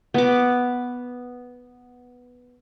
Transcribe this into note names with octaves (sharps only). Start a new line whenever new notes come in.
B3 D6